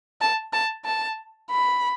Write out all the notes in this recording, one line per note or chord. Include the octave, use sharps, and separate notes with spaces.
A5
A5
A5
B5